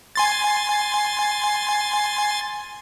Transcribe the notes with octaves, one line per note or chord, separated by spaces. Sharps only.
G#5 C6 A6